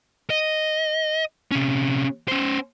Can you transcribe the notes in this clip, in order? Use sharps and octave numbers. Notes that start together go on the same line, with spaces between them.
D#5
C3 C#4
C#4 C5